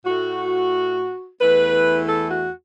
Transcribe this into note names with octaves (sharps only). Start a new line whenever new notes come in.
A2 A3 F#4
E2 E3 A3 B4
A4
F#4